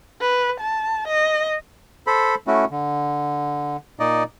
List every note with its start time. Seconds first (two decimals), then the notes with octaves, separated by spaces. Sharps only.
0.21 B4
0.61 A5
1.08 D#5
2.07 A4 C5 B5
2.47 A3 C#4 E4 F#4
2.71 D3
4.00 A#2 D#4 D5 D#5